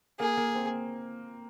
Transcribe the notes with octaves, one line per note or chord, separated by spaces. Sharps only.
A#3 G#4
A#3
C4